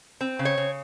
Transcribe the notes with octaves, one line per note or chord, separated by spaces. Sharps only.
C4
C#3
C#5
C#3